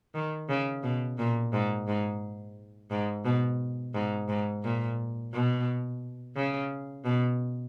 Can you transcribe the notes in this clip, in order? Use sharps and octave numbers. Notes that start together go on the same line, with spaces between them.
D#3
C#3
B2
A#2
G#2
G#2
G#2
B2
G#2
G#2
A#2
B2
C#3
B2